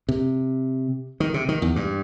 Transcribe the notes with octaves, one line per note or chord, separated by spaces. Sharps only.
C3
D#3
C3
D#3
E2
G2